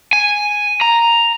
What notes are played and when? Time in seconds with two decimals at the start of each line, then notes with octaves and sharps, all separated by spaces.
0.13 G#5
0.81 A#5